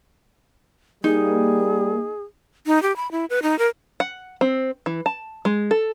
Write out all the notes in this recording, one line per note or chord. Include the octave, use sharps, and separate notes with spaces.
G3 A#3 D#4 G#4
D#4
G4
B5
E4
B4
D#4
A#4
F#5
C4
E3
A5
G#3
A4